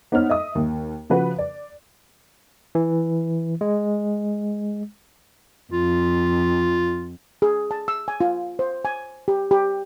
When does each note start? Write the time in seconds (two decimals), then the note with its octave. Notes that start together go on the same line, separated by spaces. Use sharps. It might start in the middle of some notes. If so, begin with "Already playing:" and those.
0.12 B3 D#4 C5 C#5 F6
0.29 D#5 E5 D#6
0.55 D#2
1.10 C#3 F3 F#4 B4
1.39 D5
2.75 E3
3.61 G#3
5.73 F2 F4
7.42 G#4
7.71 A5
7.88 E6
8.08 G#5
8.21 F4
8.59 C5
8.85 G#5
9.28 G4
9.51 G4